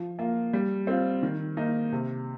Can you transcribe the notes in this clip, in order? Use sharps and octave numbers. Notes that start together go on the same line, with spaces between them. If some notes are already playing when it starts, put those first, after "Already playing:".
Already playing: F3
A#3 F4
G3
C4 F4
D#3
A#3 D#4
C3